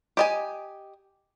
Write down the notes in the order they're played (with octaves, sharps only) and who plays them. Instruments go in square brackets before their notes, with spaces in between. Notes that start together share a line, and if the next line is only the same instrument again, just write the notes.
[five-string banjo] G4 D#5 G#5